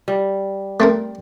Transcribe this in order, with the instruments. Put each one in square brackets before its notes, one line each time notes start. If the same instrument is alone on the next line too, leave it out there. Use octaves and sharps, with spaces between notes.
[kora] G3
[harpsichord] A3 C4 A#4